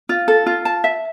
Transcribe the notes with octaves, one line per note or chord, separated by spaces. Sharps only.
F4
A4
F4
A5
E5